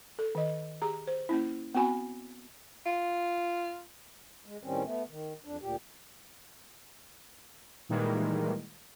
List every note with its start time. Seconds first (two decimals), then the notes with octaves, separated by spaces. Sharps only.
0.19 A4
0.35 D#3 D#5
0.82 G4 G#4 A#5
1.07 C5
1.29 A#3 C#4 E4
1.74 B3 C4 F#4 G#5 B5
2.86 F4
4.46 G#3
4.63 A2 D#3 G3 C4 C#4
4.84 A3 B3
5.09 D#3
5.45 F2 D4
5.61 D2 A#2 G4
7.89 A#2 D#3 E3 G3 G#3